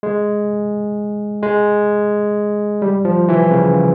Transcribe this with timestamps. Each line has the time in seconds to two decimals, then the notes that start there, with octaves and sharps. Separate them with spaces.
0.03 G#3
1.42 G#3
2.82 G3
3.05 F3
3.28 E3
3.51 C#3